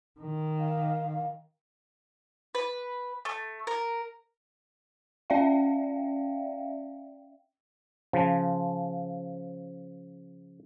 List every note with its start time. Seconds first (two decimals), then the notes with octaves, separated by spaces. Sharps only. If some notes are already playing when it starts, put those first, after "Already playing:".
0.20 D#3
0.60 F5
2.55 B4
3.25 A3
3.67 A#4
5.30 C#4 D5 E5 F5 G5
8.13 C#3 F3